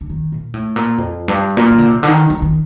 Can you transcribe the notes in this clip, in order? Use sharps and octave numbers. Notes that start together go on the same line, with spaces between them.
D3
D#3
A#2
A2
A#2
F2
G2
A#2
D#3
D3
C3
D3
D#3
D#3
D#3